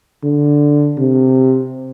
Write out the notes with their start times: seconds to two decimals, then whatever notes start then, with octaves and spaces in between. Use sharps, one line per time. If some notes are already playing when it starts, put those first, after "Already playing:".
0.24 D3
0.98 C3